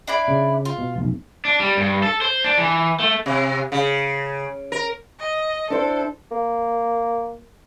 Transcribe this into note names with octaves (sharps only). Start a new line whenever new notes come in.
D4 E4 D5
C#3
F4
B2
F1 B1
D4
G3
G2
A4
C5
D4
E3
A3
C3
C#3
A#4
D#5
D4 E4 A4 C5
A#3